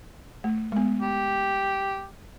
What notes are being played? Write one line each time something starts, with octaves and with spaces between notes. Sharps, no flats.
A3
G#3 B3
G4